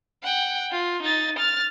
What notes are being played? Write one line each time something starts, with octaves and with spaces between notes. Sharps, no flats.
F#5 G5
F4
D#4 A6
F6 A6